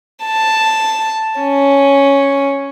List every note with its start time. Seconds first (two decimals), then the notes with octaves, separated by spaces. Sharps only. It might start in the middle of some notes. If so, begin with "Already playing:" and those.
0.24 A5
1.41 C#4